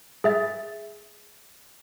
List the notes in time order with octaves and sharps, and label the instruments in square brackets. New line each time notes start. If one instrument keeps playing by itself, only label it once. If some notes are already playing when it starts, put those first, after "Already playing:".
[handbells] G#4 E5 A6